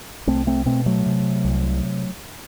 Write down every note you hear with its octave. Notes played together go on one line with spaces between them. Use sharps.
C2 A3 C4
A3 C4
B2 A3 C4
F#3 A3
C3
C2